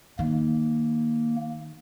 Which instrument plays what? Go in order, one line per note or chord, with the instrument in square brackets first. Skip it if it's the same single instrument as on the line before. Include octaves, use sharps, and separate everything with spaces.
[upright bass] D#3 [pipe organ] A#3